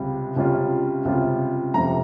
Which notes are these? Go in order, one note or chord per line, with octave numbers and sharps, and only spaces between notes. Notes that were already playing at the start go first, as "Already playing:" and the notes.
Already playing: C#2 C3 G3
C#2 C3 G3 C#4 F4
C#2 C3 G3 C#4 F4
F1 F2 C3 G3 A#5